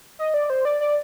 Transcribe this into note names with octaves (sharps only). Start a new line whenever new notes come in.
D#5
D5
C5
D5
D5